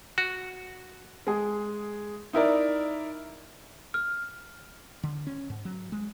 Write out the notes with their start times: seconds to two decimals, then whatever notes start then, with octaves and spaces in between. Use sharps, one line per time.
0.18 F#4
1.27 G#3 G#4
2.33 D#4 E4 A#4 D5
3.94 F6
5.03 D3
5.27 C#4
5.50 G#2
5.65 F#3
5.92 G#3